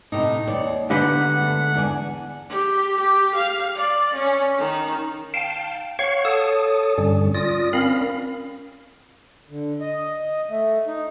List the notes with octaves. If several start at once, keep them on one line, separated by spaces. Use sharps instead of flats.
A2 C3 D#4
D#2 C#5 D5
G#2 D3 B3 G4 F#5
A3
E2 D4 G#5
G4
G4
F5
D5
C#4
D#3
F5 G5 A5
C#5 F5 F#5 C#6
A4 C#5 A5 D#6
G2 D3 G3 C#4
F4 D5 D#6 A#6
C4 C#4 A#4 F5 B5
D3
D#5
A3
D#4